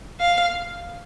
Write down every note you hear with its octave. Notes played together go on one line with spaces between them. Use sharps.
F5